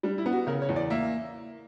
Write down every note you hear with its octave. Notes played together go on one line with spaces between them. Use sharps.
G3 D4
E4
B3
F#4
C#3 A#4
C#5
E2
D5
A#3 E5